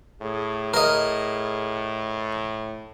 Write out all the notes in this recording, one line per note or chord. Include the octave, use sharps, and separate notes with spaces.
A2 G#4
A#4 D#5